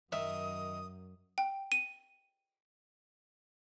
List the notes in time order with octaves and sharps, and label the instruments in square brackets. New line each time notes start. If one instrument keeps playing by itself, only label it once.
[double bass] F#2 [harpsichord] D#3 [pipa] E5 [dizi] D#6
[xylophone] G5
D#7